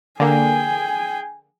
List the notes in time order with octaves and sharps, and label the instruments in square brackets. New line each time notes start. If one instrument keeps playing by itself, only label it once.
[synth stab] D3 A#3 [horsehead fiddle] G#4 G5 [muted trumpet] G#5